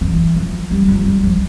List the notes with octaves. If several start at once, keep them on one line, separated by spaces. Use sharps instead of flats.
E3
F3
G3
F3
G3
F3